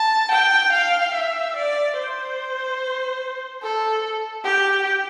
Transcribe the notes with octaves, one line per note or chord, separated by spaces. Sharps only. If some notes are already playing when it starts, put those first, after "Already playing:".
Already playing: A5
G5
F5
E5
D5
C5
A4
G4